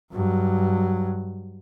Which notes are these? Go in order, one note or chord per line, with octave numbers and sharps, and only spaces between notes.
G2 F#3